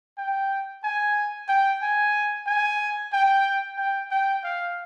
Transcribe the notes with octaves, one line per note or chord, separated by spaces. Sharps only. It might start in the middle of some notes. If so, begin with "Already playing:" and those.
G5
G#5
G5
G#5
G#5
G5
G5
G5
F5